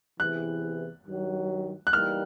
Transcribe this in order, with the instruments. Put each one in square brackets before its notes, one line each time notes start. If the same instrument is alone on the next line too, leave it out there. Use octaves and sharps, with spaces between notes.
[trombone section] E2 C3 E3 [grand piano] F#6
[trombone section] G2 D#3 F#3
[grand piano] F#6
[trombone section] E3 G3 A#3 D#4 [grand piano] F6